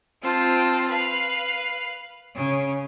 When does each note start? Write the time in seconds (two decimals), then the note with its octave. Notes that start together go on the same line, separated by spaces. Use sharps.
0.22 C4 F4 C5 A5
0.89 B4 F5
2.34 C#3